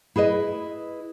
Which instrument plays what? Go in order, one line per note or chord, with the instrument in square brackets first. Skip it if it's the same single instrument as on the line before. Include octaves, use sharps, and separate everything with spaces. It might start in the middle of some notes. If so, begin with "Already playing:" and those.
[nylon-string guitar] E4 G#4 B4 D#5